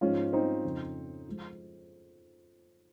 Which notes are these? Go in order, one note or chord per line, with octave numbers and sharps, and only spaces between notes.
G#2 F3 G#3 C#4 F4
C4 D#4
F2 C#3 F3
F3 G#3